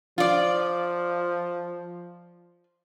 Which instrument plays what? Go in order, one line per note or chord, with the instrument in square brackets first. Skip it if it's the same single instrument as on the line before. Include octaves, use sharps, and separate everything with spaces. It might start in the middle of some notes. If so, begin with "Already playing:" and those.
[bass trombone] F3 [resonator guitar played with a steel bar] F4 D5